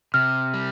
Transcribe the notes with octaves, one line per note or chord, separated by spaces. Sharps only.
C3 F6
G3